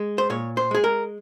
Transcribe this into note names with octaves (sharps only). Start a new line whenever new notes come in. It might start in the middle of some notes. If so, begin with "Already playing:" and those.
Already playing: G#3
C5
A#2 C#5
C5
G#3 G#4
A#4